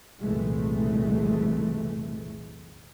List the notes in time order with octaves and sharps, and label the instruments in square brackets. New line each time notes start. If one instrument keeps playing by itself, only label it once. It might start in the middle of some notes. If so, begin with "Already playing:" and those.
[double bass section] F#1 C2 A#2 E3 G#3 A3